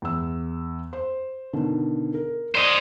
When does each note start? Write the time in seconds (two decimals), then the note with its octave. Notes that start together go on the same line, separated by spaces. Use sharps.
0.02 E2 E6
0.93 C5
1.53 B2 D3 D#3
2.14 A#4
2.55 C5 D5 D#5 D#6